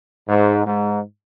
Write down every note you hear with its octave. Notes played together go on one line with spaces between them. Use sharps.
G#2
G#2